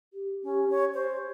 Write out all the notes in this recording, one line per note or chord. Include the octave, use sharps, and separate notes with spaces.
G4
C#4 G4
C#5
C5